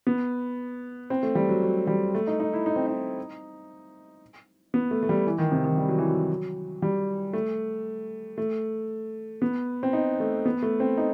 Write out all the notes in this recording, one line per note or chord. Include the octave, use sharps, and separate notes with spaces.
B3
C4
A3
G3
F#3
F#3
G3
A3
D#4
D#4
E4
D#4
C4
D#4
B3
A3
A3
G3
E3
D#3
C3
D#3
G3
F#3
E3
F#3
G3
A3
A3
B3
C4
D#4
A3
B3
A3
C4
D#4